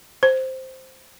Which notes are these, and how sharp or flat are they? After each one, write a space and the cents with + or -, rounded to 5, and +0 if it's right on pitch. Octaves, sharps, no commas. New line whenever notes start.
C5 +0